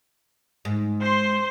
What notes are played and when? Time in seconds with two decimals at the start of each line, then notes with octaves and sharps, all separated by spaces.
0.65 G#2
1.01 C5 C6